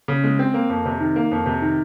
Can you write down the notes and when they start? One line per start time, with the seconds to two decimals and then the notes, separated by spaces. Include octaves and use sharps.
0.08 C#3
0.24 G#3
0.39 C4
0.54 A#3
0.70 F2
0.85 C3
1.00 D#3
1.16 A#3
1.31 F2
1.46 C3
1.62 D#3